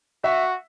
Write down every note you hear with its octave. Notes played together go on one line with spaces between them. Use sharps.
F#4 E5